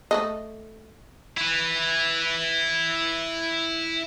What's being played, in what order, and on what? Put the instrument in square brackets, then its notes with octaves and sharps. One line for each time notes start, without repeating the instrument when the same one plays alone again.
[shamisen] A3 A4 D#5
[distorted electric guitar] E4 B4